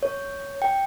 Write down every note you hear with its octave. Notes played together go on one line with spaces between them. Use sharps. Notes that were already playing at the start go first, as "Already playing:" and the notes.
C#5
G5